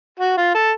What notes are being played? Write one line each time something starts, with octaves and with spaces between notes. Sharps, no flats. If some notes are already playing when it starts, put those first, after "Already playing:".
F#4
F4
A4